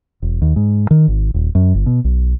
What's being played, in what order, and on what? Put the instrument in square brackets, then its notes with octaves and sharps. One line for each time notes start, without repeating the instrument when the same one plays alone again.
[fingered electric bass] E1
D#2
G#2
D#3
G#1
D#1
F#2
G1
B2
B1